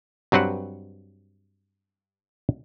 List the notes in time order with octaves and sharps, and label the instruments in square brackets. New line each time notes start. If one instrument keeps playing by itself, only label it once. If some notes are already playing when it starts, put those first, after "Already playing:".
[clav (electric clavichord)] G2 F#3 C4 B4 F#5